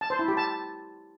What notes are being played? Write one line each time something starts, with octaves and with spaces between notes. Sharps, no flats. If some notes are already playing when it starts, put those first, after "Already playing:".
A5
C5
E4
G4
A5